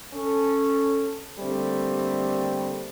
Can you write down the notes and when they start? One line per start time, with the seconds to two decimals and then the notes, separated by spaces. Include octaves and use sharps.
0.14 C#4 A4
1.39 D3 G3 A3 A#3 C4